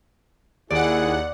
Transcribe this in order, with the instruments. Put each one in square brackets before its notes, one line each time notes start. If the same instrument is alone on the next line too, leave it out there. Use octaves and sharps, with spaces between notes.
[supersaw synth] D#2 F#5 [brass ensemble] E4 G#4 [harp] D5